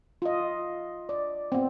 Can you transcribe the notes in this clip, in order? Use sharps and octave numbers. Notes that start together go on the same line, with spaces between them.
F4 D#5
D5
B3 C4